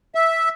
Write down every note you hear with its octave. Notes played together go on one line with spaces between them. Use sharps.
E5